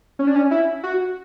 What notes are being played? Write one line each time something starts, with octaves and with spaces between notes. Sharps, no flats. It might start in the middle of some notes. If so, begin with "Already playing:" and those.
C#4
D4
C#4
E4
F#4